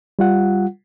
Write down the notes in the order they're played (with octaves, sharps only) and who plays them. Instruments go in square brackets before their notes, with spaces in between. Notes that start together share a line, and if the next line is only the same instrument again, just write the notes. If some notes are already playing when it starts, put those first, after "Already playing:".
[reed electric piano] G3 F4 F#5